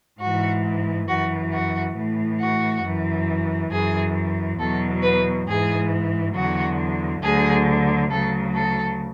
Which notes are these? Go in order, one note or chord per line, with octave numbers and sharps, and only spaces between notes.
G#2 E3 F#4
F#2 E3 F#4
F#4
A2 E3
F#4
F#2 E3
F#2 E3 G#4
E2 B2 F#3 A4
B4
G#2 E3 G#4
E2 D3 F#3 F#4
D2 D3 F#3 G#4
D2 C#3 F#3 A4
A4